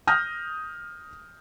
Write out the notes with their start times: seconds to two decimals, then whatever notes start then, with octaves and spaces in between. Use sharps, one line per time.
0.07 D#6 F6 G6 A#6